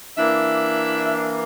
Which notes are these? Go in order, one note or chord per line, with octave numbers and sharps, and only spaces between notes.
E3 A#3 D4 E4 E5